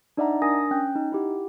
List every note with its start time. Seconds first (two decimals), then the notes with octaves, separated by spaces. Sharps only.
0.17 D4 D#4 D5 E5 F#5 A#5
0.42 D4 A#4 G#5 D#6 A#6
0.71 C#4 G5 F#6 G6
0.95 D#4
1.12 E4 G4 F#5